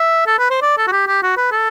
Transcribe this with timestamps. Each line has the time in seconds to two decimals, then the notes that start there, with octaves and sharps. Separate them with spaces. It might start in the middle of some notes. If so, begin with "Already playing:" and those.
Already playing: E5
0.27 A4
0.39 B4
0.50 C5
0.62 D5
0.78 A4
0.87 F#4
0.92 G4
1.08 G4
1.23 F#4
1.37 B4
1.52 A4